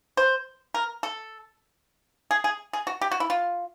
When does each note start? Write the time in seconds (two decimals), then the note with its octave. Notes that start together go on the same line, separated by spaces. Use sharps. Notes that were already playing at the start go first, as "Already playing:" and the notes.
0.17 C5
0.74 A#4
1.03 A4
2.31 G#4
2.44 G#4
2.73 G#4
2.87 F#4
3.01 G4
3.11 F#4
3.20 E4
3.30 F4